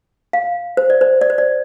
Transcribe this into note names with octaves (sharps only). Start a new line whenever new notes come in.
F5
C5
D5
C5
D5
C5
D5